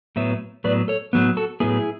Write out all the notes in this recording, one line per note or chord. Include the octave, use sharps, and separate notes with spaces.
A2 F#3 B3 C#5 E5
A2 F#3 B3 B4 D5
A4 C#5
A2 F#3 B3
F#4 A4
A2 F#3 B3 E4 G#4